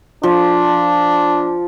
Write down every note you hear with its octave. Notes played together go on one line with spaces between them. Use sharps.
F3 D4